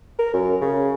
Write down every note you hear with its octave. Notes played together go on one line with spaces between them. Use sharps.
A#4
F#2
C#3